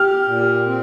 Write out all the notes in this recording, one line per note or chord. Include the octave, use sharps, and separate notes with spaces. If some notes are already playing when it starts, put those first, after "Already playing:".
Already playing: G4 F6
A#2
C4